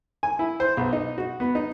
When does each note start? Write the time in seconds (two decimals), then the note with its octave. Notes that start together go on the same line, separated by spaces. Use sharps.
0.23 G#5
0.39 E4
0.60 C5
0.77 B1
0.93 D#4
1.18 F#4
1.40 B3
1.55 D#4